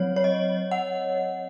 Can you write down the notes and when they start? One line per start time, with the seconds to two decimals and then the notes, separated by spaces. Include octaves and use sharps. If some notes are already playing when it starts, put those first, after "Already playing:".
Already playing: F#3 C4 C#5
0.16 C#5
0.24 D#5
0.71 F#5